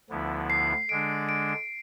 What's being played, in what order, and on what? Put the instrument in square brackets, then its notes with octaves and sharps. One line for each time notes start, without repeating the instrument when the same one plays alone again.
[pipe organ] D2 D3 F3 B3 E4
[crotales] C7
[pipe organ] D3 G#3 D4 [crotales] D7
[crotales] D7
D7